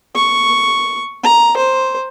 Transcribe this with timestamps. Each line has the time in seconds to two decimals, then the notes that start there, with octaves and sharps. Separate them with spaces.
0.15 C#6
1.24 A#5
1.57 C5